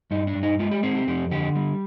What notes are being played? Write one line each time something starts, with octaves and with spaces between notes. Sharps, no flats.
G2 D#4
D4
G2
D#4
G#3 F4
G4
C4 G#4
G4
F2 G4
D3 G4
G3